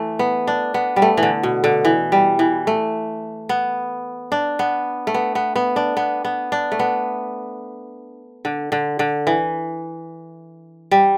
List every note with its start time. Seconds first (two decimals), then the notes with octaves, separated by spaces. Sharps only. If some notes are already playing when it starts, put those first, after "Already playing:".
Already playing: E3 A3
0.19 B3
0.47 D4
0.74 B3
0.96 G3
1.02 A3
1.17 E3
1.23 D3
1.43 B2
1.64 D3
1.85 E3
2.12 G3
2.39 E3
2.67 A3
3.49 B3
4.32 D4
4.59 B3
5.07 A3
5.14 B3
5.35 B3
5.56 B3
5.76 D4
5.97 B3
6.24 B3
6.52 D4
6.72 A3
6.79 B3
8.45 D3
8.72 D3
8.99 D3
9.27 E3
10.91 G3